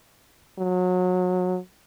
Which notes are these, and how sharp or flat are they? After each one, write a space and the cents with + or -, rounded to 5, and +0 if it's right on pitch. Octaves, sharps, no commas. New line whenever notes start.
F#3 -25